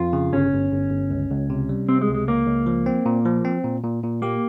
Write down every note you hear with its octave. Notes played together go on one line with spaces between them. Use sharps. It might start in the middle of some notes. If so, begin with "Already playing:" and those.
Already playing: F2 F4
C#3
G1 C#4
G1
G1
G1
C#2
C#2
C3
G3
C3 C4
G#3
C#2
G#3
C#2 A#3
C#2
F3
C4
A#2
F3
C4
A#2
A#2
A#2
A#3 G4